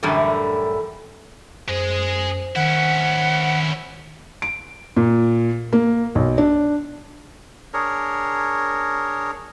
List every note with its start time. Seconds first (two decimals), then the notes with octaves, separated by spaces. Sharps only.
0.03 F#2 A2 D3 E3 G3
1.68 F#2 G#3 G#4 C5
2.56 D#3 C#4 E4 F#5
4.42 D7
4.96 A#2
5.73 A#3
6.15 B1
6.38 D4
7.74 D4 G#4 A#4 C#5